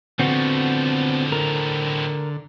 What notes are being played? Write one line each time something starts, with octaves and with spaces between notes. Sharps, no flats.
A2 D3 F3 B3 C4 F#4
A#4